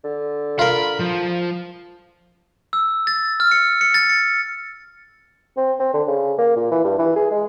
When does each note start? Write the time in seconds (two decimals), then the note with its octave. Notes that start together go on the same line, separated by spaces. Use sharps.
0.04 D3
0.59 F4 A#4 B5
0.99 F3
2.73 E6
3.07 A6
3.40 F6
3.51 C#7
3.81 C#7
3.94 A6
4.09 C#7
5.57 C4
5.80 C4
5.94 D3
6.08 C#3
6.38 A#3
6.56 A#2
6.72 E3
6.84 G2
6.99 E3
7.16 G#4
7.31 G#3